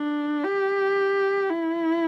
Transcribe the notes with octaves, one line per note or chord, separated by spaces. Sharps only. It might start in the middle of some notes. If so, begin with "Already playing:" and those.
Already playing: D4
G4
E4